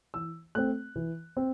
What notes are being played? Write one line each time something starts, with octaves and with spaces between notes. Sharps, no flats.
E3 E6
A3 C4 F#6
E3
C4